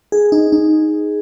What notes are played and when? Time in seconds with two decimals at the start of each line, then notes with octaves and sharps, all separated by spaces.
0.12 G#4
0.32 D#4
0.52 D#4